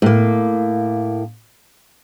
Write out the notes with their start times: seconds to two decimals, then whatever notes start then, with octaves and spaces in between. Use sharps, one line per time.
0.02 A2 A#3